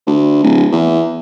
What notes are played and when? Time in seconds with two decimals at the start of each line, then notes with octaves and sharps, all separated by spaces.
0.06 D2
0.43 D1
0.72 E2